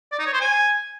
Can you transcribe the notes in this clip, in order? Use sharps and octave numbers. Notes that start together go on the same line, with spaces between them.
D5
D#4
C#5
C5
G#5